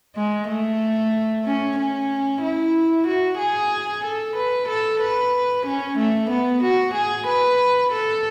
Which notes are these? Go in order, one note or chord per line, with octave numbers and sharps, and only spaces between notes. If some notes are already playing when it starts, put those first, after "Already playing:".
G#3
A3
C#4
C#4
E4
F#4
G#4
A4
B4
A4
B4
C#4
A3
B3
F#4
G#4
B4
A4